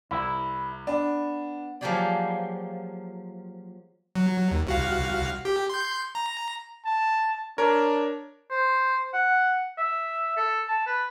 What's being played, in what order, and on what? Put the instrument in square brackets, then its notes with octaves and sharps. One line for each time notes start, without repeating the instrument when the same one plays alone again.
[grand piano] C2 [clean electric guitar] E4
[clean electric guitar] B3 [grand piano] D4
[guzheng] F3 F#3 A#3 G4 G#4 D5
[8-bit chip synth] F#3
D#2
C2 F#4 F5
G4
C6 G6
A#5
[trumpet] A5
[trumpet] D4 [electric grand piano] A#4 C#5
[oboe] C5
F#5
E5
A4
A5
B4